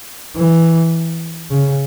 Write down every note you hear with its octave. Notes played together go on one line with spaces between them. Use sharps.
E3
C#3